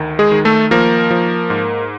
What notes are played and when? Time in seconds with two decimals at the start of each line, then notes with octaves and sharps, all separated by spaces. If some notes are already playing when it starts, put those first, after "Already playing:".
Already playing: D2 D#3
0.19 G#3 G#4
0.32 D#3
0.45 A3 A4
0.71 F3 A#3 A#4
1.11 F3
1.50 G#2